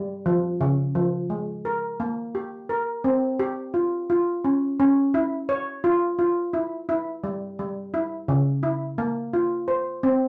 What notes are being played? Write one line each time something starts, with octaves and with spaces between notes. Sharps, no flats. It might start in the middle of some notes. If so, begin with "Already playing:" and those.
Already playing: G3
F3
C#3
F3
G#3
A#4
A#3
G4
A#4
C4
G4
F4
F4
C#4
C#4
E4
C#5
F4
F4
E4
E4
G3
G3
E4
C#3
E4
A#3
F4
C5
C4